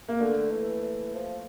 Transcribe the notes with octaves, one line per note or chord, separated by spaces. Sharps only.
A#3
D3 A3
E3
E3
F3